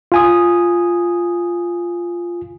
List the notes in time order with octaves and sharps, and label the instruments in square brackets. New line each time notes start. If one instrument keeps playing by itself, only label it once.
[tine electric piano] F4 G#5 D#6